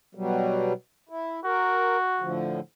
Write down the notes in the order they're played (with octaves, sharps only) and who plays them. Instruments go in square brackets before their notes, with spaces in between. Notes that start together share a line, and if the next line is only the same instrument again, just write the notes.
[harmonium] B2 F#3 G3
E4
[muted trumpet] F#4 [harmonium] A#4
[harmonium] A2 D3 F3